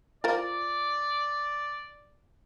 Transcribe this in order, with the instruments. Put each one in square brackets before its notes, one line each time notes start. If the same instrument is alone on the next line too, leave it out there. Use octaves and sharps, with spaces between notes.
[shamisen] F4 A#4 C5 [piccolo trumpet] D5